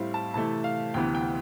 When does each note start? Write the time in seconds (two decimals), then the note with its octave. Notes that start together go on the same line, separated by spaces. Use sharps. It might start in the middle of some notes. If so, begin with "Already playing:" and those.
Already playing: A2 G3 C4 E4 F5
0.14 A5
0.34 C3 E3 A3 E4 A5
0.64 F5
0.94 D2 C3 E3 B3 G5
1.15 G5